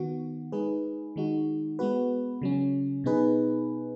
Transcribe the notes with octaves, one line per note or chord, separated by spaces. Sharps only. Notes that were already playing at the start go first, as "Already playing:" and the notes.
Already playing: D#3 B3 F#4
G#3 D#4 G#4 B4
D#3 G#3 D#4 F#4
G#3 B3 F#4 B4
C#3 F#3 C#4
B2 B3 D#4 G#4 B4